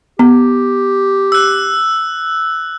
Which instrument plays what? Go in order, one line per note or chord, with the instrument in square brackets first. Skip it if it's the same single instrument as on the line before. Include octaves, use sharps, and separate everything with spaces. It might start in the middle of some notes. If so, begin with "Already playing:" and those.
[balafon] B3 [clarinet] G4
[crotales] E6 F#6